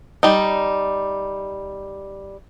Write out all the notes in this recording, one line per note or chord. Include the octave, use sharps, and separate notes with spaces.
G3 D#4